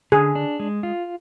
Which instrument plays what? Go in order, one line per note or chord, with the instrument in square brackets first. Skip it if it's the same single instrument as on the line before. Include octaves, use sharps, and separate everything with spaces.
[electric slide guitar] D3 [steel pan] G#4
[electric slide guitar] D4
G#3
F4